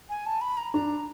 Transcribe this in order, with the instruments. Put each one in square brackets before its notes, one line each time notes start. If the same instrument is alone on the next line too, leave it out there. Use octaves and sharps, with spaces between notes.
[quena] G#5
A5
B5
A#5
[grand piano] D4 [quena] A#5